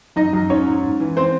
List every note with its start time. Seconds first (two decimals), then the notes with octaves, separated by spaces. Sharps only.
0.16 F#2 D#4 D#5
0.33 F#2
0.50 G#2 C#4 C#5
0.66 G#2
0.83 G#2
1.00 E3
1.17 C4 C5